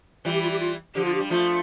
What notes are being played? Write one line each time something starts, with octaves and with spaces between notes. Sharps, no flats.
E3 G3 F4
G4
F4
G4
F4
D3 F3 G4
F4
G4
G3
F3 A3 F4